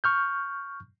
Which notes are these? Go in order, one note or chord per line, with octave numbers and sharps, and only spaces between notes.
C#6 F6 G6